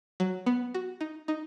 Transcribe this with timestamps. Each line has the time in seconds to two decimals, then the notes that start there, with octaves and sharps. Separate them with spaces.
0.20 F#3
0.46 B3
0.74 F#4
1.01 D#4
1.28 D#4